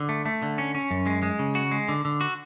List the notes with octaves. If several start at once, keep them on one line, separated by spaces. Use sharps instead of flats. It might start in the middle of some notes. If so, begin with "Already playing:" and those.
Already playing: D3
A3
A3
D3
C#4
C#4
F#2
G#3
G#3
C#3
F#4
G#3
D3
D3
F#4